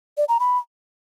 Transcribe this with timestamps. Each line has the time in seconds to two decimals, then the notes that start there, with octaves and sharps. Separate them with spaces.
0.17 D5
0.29 A#5
0.40 B5